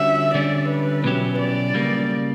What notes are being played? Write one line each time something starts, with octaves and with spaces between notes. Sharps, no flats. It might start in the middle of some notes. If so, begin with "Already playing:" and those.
Already playing: D3 G3 C#4 F#4 E5
D3 G3 C#4 D5
B4
B2 F#3 C#4 E4 G4
D5
C#3 G3 A#3